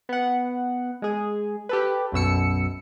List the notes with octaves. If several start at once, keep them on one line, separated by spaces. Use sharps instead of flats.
B3 F#5
G#3 G#4
G4 A4 B4
B1 F#2 B2 E6 C#7